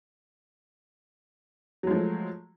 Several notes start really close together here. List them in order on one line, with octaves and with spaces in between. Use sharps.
F#3 G#3 F3 A3